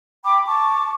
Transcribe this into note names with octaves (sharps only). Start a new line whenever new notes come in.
G5 B5 D6
A5 C#6 D6